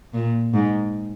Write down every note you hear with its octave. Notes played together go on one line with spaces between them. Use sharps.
A#2
G#2